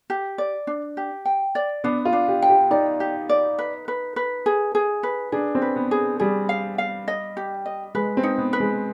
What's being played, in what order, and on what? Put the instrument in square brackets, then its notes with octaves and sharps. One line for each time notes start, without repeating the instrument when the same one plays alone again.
[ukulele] G4
D5
D4
G4
G5
D5
[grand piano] B3 [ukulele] D4
[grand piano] F4
[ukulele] D4
[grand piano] G4
[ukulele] G5
[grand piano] G4
[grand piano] D#4 [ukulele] D5
[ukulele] G4
D5
B4
B4
B4
G#4
G#4
B4
[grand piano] D4 [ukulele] G#4
[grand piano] C4
[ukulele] B4
[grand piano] B3
[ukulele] G#4
[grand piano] G3 [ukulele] G#4
[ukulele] F5
F5
D#5
G4
D#5
[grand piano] G#3 [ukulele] B4
[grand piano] C4
[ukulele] D#4
[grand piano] B3
[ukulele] B4
[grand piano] G#3